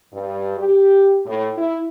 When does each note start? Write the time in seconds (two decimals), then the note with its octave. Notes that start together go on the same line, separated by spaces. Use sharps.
0.13 G2
0.58 G4
1.26 A2
1.57 E4